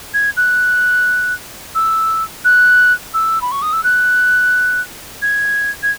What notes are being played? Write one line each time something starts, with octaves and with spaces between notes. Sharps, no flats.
G#6
F#6
E6
F#6
E6
B5
C#6
D#6
E6
F#6
G#6
G#6